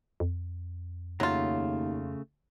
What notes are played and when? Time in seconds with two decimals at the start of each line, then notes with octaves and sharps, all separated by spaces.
0.20 F2
1.20 D#2 C#3 F#3 A3 F4